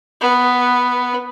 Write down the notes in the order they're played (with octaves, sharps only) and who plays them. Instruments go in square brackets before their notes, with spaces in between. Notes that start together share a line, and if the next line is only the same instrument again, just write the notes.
[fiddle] B3